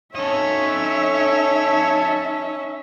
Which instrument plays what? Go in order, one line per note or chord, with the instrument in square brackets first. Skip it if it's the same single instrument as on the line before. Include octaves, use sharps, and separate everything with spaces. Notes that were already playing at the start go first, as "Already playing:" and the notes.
[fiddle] C#4 [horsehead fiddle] D#4 E5 [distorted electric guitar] A4 D#5 [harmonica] C#5